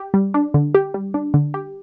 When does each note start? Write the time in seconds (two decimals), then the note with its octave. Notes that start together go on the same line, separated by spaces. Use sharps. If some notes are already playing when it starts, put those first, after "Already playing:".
Already playing: G4
0.14 G3
0.34 D4
0.54 D3
0.75 G4
0.94 G3
1.14 D4
1.34 D3
1.54 G4